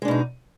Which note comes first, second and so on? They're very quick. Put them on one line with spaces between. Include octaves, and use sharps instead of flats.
G#3 D4 B2 D#4